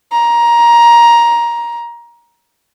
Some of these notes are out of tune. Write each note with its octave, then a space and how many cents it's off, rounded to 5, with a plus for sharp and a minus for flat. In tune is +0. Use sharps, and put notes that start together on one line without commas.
A#5 +15